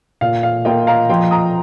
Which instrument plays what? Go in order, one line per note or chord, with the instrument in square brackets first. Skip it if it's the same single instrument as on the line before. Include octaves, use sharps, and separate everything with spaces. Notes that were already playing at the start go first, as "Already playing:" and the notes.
[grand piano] A#2 [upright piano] F5
[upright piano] F5
[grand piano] A#3 F4 [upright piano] D#5 G5
[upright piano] F5 A#5
[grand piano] F3 [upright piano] G5 C6
[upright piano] A#5 D#6